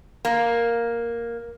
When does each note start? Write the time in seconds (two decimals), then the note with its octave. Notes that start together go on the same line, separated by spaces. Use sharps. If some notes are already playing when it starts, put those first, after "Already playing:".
0.25 A#3